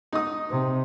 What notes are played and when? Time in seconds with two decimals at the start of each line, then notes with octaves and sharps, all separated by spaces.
0.12 D#4 D#6
0.50 C3